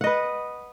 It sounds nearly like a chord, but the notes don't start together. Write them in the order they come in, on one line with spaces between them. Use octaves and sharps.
F#5 D#5 B4